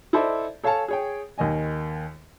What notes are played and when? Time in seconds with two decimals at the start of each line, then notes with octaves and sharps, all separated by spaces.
0.13 E4 A4 C5 D5 D#5
0.64 A4 C#5 F5 G#5 A5
0.88 G#4 C#5 G5
1.38 D#2 D#3 D#5 G#5